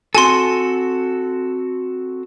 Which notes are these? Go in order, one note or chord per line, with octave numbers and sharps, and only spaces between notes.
C4 F#4 A4 G#5 C6